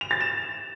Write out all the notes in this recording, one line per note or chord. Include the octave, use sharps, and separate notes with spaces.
F7
A6
E7